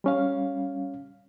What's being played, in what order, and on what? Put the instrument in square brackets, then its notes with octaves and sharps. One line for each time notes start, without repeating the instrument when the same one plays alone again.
[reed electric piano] G3 C#4 F5